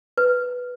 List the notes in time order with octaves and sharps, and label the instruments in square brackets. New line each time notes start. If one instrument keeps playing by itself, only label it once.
[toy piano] B4